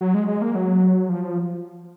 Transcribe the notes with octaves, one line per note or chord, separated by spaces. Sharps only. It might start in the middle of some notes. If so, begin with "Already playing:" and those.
F#3
G#3
G#3
A#3
F#3
F3